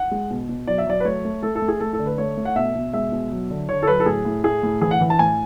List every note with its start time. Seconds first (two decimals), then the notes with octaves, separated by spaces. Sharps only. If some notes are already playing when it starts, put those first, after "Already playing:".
Already playing: F#5
0.11 G#3
0.31 B2
0.49 B2
0.67 F#3 D5
0.78 E5
0.86 F#3 D5
1.00 B4
1.05 A3 C#5
1.25 A3
1.43 A3 A4
1.55 A4
1.62 A3
1.68 G#4
1.80 A3 A4
1.93 A4
1.99 D3
2.06 B4
2.18 A3 C#5
2.37 A3
2.45 F#5
2.56 B2 E5
2.75 B2
2.93 G#3 E5
3.12 B2
3.32 F#3
3.50 D3
3.69 D3 C#5
3.83 A4
3.87 F#3 B4
4.00 A4
4.06 A2 G#4
4.25 A2
4.44 A3 G#4
4.63 A2
4.81 E3 G#4
4.91 F#5
5.01 E3
5.10 A5
5.19 A2 G#5